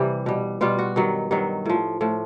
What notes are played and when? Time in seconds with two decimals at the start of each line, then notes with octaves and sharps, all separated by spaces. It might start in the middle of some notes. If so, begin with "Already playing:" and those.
Already playing: C3 E3 G3
0.26 B2 G3
0.61 B2 G3 F4
0.79 F#4
0.96 G2 D#3 F#3
1.31 G2 D#3 F#3
1.66 A2 F3
2.01 A2 F3